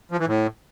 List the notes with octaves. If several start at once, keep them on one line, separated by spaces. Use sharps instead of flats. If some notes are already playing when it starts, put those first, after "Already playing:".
F3
E3
A2